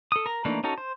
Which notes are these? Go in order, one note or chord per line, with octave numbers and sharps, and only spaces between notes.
A4 D#6
A#4 A#5
E3 A3 A#3 D4 D#4
C#4 D#4 F#4 A4
C5